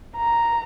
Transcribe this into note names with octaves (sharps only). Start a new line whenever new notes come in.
A#5